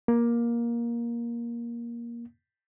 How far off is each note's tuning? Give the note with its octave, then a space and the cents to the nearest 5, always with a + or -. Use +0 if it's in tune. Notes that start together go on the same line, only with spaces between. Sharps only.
A#3 +15